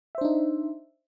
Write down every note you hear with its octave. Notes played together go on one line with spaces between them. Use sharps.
D4 D#4 C5 E5